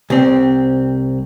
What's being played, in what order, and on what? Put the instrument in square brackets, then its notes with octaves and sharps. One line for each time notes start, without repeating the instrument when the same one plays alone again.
[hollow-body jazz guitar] C2 C4